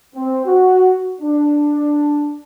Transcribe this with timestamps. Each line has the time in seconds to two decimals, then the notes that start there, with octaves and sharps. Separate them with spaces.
0.15 C4
0.45 F#4
1.21 D4